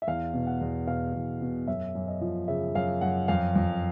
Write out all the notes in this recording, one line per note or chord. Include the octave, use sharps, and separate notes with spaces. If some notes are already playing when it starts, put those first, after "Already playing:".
E5
E2 F5
B2
F#5
E2
B2 F5
E2
B2
F#2 E5
F#2
D#5
F3
C#3 E5
F#2 F5
F#2 F#5
F2 F5
F2